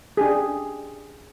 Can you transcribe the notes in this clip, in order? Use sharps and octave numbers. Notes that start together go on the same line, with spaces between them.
D4 G4 G#4